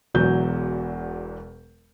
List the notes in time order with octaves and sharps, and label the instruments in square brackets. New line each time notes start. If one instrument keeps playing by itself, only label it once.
[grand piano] E1 E2 F#3 G6